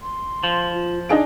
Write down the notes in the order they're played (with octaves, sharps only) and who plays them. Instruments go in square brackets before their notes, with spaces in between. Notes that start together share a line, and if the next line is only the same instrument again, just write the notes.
[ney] C6
[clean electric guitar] F3
[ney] F4
[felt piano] D4 D7 [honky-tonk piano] D#4 G#4 F5 [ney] G#5